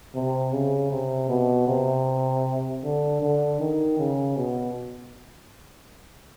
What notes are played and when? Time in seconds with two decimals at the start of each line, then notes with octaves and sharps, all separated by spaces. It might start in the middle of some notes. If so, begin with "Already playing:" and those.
0.15 C3
0.53 C#3
0.91 C3
1.29 B2
1.68 C3
2.83 D3
3.22 D3
3.60 D#3
3.99 C#3
4.37 B2